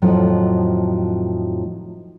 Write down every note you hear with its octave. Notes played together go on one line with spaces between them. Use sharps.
F2 A2 D#3 F3 F#3